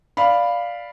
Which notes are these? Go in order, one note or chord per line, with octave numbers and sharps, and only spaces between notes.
D5 F5 B5